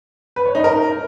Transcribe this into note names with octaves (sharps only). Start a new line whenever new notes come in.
B4
C#5
D#4
A#4